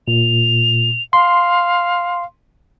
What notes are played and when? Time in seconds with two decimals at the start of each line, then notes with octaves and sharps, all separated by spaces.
0.08 A#2 F7
1.13 F5 C6